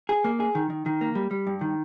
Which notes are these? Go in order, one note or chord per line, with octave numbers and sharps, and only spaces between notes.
G#4
A#3
G#4
D#3
D#3
D#3
A#3
G3
G3
G2
D#3